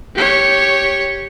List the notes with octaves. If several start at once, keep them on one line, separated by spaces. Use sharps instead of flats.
G4 C#5